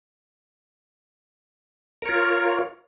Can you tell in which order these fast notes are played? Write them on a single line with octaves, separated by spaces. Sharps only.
A#4 C#5 F4